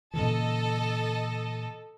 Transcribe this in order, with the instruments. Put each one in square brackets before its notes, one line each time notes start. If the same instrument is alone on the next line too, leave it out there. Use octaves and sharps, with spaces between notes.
[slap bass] A#2 C#3 E3 [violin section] A4 D#5